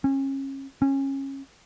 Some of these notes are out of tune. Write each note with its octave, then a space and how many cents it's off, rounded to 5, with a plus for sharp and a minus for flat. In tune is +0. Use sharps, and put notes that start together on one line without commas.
C#4 -30
C#4 -20